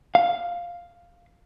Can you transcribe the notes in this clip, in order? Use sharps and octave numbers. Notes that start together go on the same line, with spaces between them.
F5